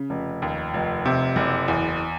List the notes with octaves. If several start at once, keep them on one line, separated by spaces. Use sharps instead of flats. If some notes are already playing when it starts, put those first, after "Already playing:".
Already playing: C#3
F1
D#2
F1
C3
F#1
E2